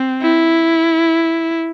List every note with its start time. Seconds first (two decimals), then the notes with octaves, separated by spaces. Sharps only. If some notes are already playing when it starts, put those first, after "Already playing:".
Already playing: C4
0.22 E4